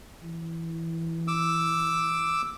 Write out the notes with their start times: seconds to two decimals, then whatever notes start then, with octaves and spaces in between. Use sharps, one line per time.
0.22 E3
1.28 D6 E6